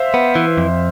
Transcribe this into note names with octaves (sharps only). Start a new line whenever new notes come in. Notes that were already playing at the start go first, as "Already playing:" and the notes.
Already playing: C5 E5 F5
B3
E3
F2